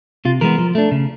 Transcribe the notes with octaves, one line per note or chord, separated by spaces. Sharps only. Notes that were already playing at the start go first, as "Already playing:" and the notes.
C3 F4
E3 G#3 B3 A#4
F3
A3 D4
C#3